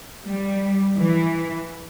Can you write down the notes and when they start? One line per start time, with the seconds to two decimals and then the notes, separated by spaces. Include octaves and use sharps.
0.25 G3
0.97 E3